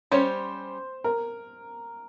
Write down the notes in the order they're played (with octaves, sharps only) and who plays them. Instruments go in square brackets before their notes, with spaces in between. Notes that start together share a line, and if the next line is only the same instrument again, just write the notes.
[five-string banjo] G3 C#4 G4 C#5 [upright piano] C5
[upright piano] A#4